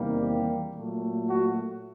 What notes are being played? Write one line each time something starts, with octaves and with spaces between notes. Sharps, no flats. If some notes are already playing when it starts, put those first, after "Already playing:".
Already playing: E2 C3 D#3 G3 A#3
G4
A#2 F#3 A3
F#4